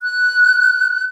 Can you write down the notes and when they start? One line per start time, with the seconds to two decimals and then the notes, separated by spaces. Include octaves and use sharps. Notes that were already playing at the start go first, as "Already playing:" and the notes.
0.03 F#6